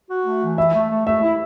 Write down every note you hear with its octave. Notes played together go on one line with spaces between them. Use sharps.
F#4
A3
E3
E4 E5
A3
A3
A3 E5
E4